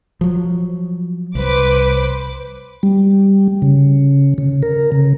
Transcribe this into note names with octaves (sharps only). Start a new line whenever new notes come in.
F3 F#3
C2 B4 C5 D6
G3
C#3
C#3
A#4
C#3